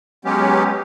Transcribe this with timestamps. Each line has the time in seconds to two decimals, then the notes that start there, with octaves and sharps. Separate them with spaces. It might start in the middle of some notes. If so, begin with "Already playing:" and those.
0.25 F#3 G#3 B3 C#4 G4